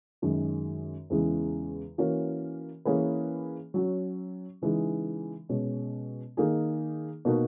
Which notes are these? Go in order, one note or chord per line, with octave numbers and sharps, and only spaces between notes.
F#2 D#3 G#3
E2 C#3 E3 G#3
E3 A#3 C#4 F#4 A#4
E3 A#3 C#4 G#4 B4
F#3 C#4 F#4
C#3 E3 G#3 D#4
B2 G#3 C#4
D#3 A#3 D#4 G#4
B2 A#3 D#4 F#4 A#4